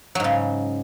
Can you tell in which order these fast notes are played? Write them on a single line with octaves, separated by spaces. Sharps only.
F#3 G#2 C#3